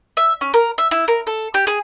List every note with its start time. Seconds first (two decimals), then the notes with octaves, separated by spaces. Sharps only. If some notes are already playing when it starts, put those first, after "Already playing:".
0.17 E5
0.41 C#4
0.54 A#4
0.78 E5
0.91 E4
1.08 A#4
1.27 A4
1.54 G4
1.67 G#4